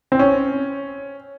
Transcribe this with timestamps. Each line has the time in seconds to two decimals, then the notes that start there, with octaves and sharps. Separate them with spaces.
0.12 C4
0.19 C#4